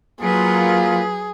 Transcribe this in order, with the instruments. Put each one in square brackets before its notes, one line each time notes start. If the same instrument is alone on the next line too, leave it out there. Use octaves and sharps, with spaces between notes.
[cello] F#3 B4 [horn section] A#3 F4 [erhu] G#4